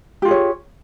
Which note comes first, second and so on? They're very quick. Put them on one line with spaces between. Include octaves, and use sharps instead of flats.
G4 F4 G#4 C#5